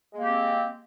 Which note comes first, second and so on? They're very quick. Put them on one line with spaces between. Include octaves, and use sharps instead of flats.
G#3 A#3 G4 C4